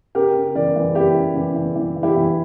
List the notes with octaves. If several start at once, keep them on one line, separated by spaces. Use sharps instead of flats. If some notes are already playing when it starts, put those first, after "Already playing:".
C#3 G4 A#4
C#3
E3 A#4 D5
E3
E3 E4 G4
C#3
E3
E3
E3
E3
E4 G4
E3